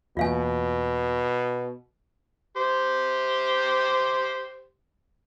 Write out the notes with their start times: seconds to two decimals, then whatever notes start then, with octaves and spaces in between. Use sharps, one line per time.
0.17 E2 B2 A#3 F4 F5 G#5
2.56 G4 C5